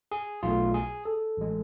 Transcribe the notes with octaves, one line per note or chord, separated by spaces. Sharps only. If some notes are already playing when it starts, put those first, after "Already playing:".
G#4
B1 B2 A3 F4
G#4
A4
A1 G#3